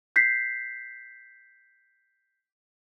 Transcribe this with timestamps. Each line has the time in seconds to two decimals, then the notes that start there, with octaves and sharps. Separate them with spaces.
0.16 G6 B6 C7